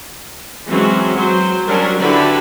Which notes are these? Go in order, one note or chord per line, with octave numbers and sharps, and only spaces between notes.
E3 F#3 G#3 C4 C#4 F#4
F#3 C5
F#3 G3 C#4 D4 F#4 A#4
D3 E4 F#4 G4 B4 B5